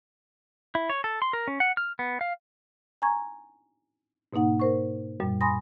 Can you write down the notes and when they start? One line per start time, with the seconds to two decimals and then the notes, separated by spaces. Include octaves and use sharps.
0.75 E4
0.90 C#5
1.04 A4
1.22 C6
1.33 A#4
1.48 C#4
1.60 F#5
1.77 F6
1.99 B3
2.21 F5
3.02 G#5 A#5 C#6 G#6
4.33 G#2 B2 A#3 D#4 F#5
4.60 A#4 C5 C#6
5.20 F#2 A#2 G3
5.41 G#5 B5 C6 D#6 A#6